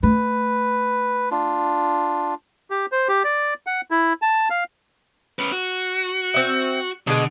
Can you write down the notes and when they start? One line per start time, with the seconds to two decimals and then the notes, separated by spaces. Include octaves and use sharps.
0.03 A3 B4
1.31 D4 F4
2.70 G4
2.92 C5
3.08 G4
3.24 D5
3.67 F#5
3.91 E4
4.22 A5
4.50 F5
5.39 C#4 B4
5.52 F#4
6.34 C4 E5
7.07 B2 D3 G#3